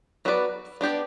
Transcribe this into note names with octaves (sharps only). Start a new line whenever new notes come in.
F#3 B3 F#4 B4 D5
B3 D4 G4 D5